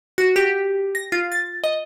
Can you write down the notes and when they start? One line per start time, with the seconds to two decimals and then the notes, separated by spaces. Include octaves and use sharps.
0.18 F#4
0.36 G4
0.95 A#6
1.12 F4
1.32 A6
1.64 D#5